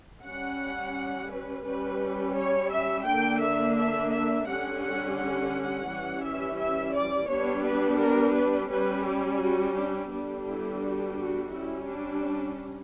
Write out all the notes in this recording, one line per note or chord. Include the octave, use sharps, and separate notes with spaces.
G3 C#4 F#5
B4
G3 C#4 B4
C#5
E5
D3 A#3 D4 G5
E5
E5
E5
D3 G3 C#4 F#5
F#5
F#5
E3 G3 C#4
E5
E5
D5
G3 B3 D4 C#5
B4
A#4
B4
G3 C#4 B4
G4
F#4
D4
D3 G3 B3 D4
E4
F#4
F#4
G3 C#4 E4
D4